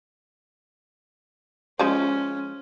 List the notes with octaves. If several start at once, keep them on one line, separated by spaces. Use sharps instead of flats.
F3 G#3 C#4